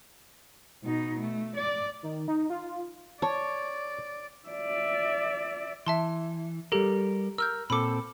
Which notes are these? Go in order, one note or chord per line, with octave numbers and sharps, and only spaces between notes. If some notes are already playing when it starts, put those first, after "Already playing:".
B2 D#4
A3
D5
D#3
D#4
F4
C#5 D5 A5
D5 E5
E3 E5 A5 C6
G3 G4 A4 A#4
A#4 E6 F6 G6
A#2 C4 A4 B5 D6